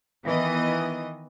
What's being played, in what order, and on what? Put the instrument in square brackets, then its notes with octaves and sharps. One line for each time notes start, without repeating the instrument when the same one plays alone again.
[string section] D#3 E3 B3 D#5